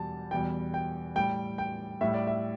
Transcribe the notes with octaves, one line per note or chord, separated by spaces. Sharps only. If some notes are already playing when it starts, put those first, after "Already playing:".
Already playing: E2 B2 G3 A5
E2 B2 G3 G5
G5
A2 G3 G5
G5
A2 G3 E5
D5
E5